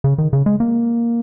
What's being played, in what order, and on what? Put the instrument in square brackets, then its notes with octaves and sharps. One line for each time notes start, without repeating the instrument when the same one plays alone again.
[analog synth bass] C#3
D#3
C#3
G#3
A#3